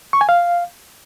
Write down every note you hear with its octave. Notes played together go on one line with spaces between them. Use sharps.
C#6
G#5
F5